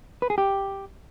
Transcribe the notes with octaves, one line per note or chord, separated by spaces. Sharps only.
B4
G#4
G4